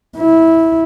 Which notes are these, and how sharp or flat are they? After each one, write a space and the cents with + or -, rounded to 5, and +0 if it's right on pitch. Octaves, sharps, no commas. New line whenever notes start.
E4 -15